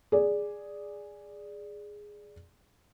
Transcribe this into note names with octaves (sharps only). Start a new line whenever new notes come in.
G#4 D5